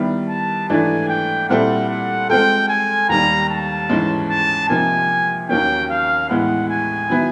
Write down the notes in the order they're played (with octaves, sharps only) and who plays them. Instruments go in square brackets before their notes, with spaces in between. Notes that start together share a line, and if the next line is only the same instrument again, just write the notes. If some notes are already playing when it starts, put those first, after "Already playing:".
Already playing: [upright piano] D#3 G3 B3 E4
[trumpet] A5
[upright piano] G#2 E3 A3 D4 [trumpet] G#5
[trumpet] G5
[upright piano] A#2 G3 C4 E4 A4 [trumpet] F#5
[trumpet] F#5
[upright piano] G#3 C4 F4 A4 [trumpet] G5
[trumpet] G#5
[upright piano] D#2 D#3 G3 [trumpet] A#5
[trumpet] A5
[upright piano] G#2 E3 G#3 C#4
[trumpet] A5
[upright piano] C3 F3 A#3 D#4 [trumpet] G#5
[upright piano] D#2 D#3 F#3 A#3 C#4 [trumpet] G5
[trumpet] F5
[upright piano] A2 E3 G#3 B3 [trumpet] F#5
[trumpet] G#5
[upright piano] D#3 F#3 B3 E4